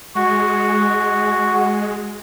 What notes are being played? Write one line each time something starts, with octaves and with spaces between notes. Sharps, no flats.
G#3 F#4